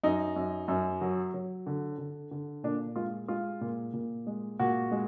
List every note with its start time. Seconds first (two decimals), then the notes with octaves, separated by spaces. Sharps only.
0.03 F#2 D#4
0.36 F#2
0.68 F#2
1.01 F#3
1.34 F#3
1.67 D3
1.98 D3
2.31 D3
2.64 A#2 D4
2.96 G#3 F4
3.28 G#3 F4
3.61 A#2
3.93 A#2
4.27 G#3
4.60 A#2 F#4
4.92 G#3